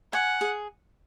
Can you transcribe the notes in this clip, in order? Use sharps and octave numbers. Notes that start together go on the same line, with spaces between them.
F#5 G#5
G#4